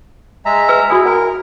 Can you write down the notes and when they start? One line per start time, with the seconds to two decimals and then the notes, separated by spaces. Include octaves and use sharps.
0.45 G#3 E5 A#5
0.69 B4 G#5 E6
0.90 E4 F#4 G#4 G#5
1.06 A#4 F#5 G#5